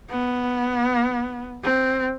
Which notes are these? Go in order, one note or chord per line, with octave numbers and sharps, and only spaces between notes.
B3
C4